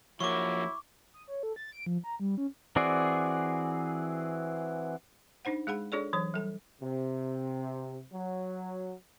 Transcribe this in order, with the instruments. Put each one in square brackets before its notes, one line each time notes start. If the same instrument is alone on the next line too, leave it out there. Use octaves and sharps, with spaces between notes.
[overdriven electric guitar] F3 A#3 [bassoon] F#3 [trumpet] E4 [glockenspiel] C#6 D6
[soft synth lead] D#6
C#5
A4
A6
D7
F3
A#5
G3
C#4
[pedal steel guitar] E3 C4 F#4 G#4 D5
[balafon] D4 D#4 C5 F#5
G#3 G#4 F#5 B5
D4 F4 G#4 A4 C#5 D5
E3 F#3 C#5
G3 A4
[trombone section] C3
F#3